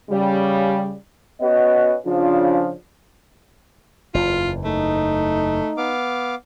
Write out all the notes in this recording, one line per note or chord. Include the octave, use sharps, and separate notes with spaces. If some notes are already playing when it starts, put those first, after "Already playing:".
C#3 G3
B3 C#4 F#4 B4 D#5
C#3 F3 D4 F4
F#1 E2 F4
A3 D#4
B3 F5 D6